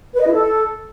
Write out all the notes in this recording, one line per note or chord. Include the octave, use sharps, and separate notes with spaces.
B4
D#5
E4
A4